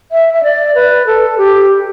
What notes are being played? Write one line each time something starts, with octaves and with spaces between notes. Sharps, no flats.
E5
E5
D5
B4
A4
G4